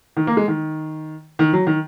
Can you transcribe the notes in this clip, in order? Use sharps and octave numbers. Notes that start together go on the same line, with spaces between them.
D#3
A#3
G#3
D#3
D#3
F#3
D#3